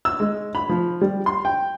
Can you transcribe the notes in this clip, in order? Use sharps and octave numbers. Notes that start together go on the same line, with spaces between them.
E6
G#3
B5
F3
G3
C6
G5